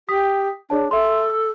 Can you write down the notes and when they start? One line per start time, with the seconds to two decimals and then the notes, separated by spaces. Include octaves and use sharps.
0.09 G4 D#6 B6
0.70 D4 G#4 C#5 A5
0.91 A4 E5 C6
1.30 E6